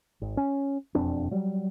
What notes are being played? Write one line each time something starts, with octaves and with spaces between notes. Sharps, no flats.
G#1
C#4
E1 F2 C4 D4
F#3 G3